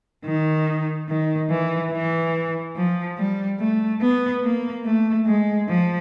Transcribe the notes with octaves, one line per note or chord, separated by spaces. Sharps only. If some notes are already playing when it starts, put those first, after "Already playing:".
D#3
D#3
E3
E3
F3
G3
A3
B3
A#3
A3
G#3
F3